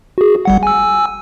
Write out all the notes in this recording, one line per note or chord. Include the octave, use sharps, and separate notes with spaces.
F#4 G#4
G1 G3 F#5
G#5 E6